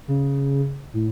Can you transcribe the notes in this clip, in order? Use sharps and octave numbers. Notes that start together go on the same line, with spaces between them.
C#3
A2